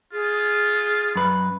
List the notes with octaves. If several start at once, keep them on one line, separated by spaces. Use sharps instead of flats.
F4 G#4
F#2 B4